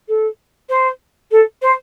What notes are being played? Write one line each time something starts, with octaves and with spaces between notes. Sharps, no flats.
A4
C5
A4
C5